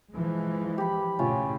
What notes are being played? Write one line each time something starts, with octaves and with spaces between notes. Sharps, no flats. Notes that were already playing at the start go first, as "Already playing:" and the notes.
E3 F3 G#3
G4 B5
A2 C#3 C#4 F4